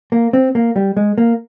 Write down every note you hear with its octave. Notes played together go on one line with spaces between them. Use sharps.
A#3
C4
A#3
G3
G#3
A#3